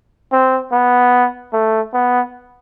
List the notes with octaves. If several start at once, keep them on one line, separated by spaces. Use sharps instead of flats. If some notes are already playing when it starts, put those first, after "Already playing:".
C4
B3
A3
B3